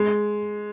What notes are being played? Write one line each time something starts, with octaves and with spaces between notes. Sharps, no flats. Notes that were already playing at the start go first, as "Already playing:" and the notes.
Already playing: G#3